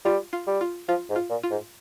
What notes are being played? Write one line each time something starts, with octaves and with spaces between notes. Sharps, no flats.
G3 F4
F4
G3
F4
F3 F4
G#2
F4
A#2
F4
G#2